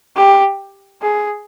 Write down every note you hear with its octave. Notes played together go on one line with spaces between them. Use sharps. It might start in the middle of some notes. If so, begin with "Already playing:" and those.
G4
G#4